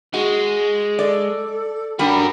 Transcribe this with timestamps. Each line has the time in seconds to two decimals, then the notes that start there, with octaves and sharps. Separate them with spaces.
0.14 G#3 F#4
0.99 A4 D5
1.99 G3 D4 F#4 A#4